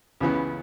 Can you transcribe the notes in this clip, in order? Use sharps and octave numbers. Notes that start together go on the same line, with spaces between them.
C#2 C#3 E3 B3